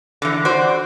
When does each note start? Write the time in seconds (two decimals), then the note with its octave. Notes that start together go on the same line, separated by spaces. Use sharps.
0.22 D3 E3
0.45 F#4 C5 D5